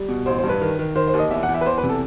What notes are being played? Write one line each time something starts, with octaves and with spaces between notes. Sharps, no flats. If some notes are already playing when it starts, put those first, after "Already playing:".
Already playing: G3
B2
A1 C5
C5
G2
B4
D#3
D#3
D#3 C5
C5
D#2
D#5
E2 E5
F#5
E2
E5
B4
E2 C5
B4
C3
A4